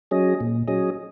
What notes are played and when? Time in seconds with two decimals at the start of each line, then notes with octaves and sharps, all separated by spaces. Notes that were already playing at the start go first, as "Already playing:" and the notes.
0.11 F#3 C#4 G#4 D#5
0.40 A#2
0.68 F#3 C#4 G#4 D#5